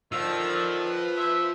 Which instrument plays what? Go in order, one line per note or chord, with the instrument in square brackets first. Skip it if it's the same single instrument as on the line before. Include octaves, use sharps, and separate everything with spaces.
[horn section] D3 D#3 [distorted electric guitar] F3 [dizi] E6
[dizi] B4
[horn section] C5 E5